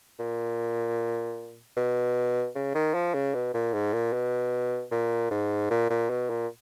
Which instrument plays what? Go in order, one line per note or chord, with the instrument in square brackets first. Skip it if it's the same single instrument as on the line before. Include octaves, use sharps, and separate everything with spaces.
[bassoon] A#2
B2
C#3
D#3
F3
C#3
B2
A#2
G#2
A#2
B2
A#2
G#2
A#2
A#2
B2
A#2